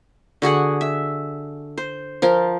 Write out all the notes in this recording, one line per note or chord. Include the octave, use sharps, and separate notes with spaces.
D3 F#4 G#4 F#5
E5
C5
F3 F4 A#4